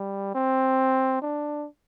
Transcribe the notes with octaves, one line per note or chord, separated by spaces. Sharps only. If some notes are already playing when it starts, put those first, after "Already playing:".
Already playing: G3
C4
D4